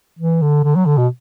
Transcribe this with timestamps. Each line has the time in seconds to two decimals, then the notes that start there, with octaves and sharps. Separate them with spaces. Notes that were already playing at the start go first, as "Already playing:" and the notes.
0.19 E3
0.42 D3
0.64 D3
0.75 F#3
0.86 D3
0.98 B2